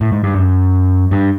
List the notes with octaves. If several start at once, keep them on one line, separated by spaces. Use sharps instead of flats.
A2
G#2
G2
F#2
G2